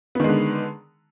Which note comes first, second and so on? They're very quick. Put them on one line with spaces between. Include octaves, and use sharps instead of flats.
B3 D#3 G#3 D3